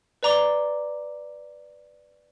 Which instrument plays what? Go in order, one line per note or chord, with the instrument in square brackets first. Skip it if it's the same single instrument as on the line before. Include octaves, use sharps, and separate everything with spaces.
[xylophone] B4 D5 A#5 D6 G7